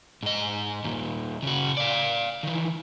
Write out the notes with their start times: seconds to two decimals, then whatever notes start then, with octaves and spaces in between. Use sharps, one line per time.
0.23 G#2 D#5
0.84 D#2 A#2
1.43 C#3 F#4
1.77 D5 F5
2.43 D#3 E3